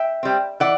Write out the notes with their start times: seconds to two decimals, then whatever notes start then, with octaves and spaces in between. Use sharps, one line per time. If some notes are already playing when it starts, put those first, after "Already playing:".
Already playing: E5 G5
0.23 G3 C4
0.60 E3 D5 F#5